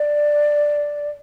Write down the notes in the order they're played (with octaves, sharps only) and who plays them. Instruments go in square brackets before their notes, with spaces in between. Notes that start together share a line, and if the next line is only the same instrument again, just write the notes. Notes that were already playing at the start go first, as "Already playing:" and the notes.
Already playing: [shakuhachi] D5